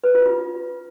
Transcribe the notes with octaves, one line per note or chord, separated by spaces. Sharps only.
B4
F4
F4